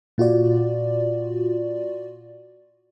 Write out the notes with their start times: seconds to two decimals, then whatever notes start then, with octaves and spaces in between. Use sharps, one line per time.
0.18 A#2 F4 F#4 D5